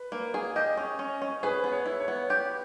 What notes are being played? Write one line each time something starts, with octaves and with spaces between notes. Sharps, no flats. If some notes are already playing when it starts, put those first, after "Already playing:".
Already playing: B4
A#3
G#4
G4 D#5
C#4
C#4
C#4
G#4 B4
B3
C#5
E4
C#5
B3
G4